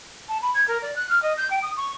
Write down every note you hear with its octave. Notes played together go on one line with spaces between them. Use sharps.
A5
B5
G#6
A#4
D5
F#6
F6
D#5
G6
G5
D#6
C#6